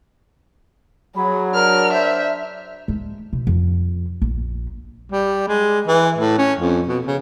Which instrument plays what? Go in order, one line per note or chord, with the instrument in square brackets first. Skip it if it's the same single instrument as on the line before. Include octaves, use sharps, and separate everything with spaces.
[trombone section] F#3 [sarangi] G#4 [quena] B5
[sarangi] D4 [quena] A#4 [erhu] F6
[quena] C5 [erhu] E5
[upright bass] G#3
B2
F2
A#1
[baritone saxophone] G3
G#3
E3
A2
C#4
F2
B2
C#3